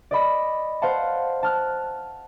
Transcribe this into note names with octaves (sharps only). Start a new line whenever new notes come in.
D5 D#5 B5 A#6
C5 F5 F#5 A5
A5 F6 F#6